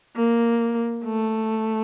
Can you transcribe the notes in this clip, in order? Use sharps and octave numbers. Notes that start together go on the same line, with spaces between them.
A#3
A3